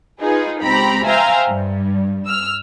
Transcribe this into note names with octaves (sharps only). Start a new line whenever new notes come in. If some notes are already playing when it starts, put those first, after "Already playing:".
D#4 F4 G#4 B4
C#2 C4 G4 A#5 B5
C5 E5 F5 G5 G#5 A#5
G2
E6 F6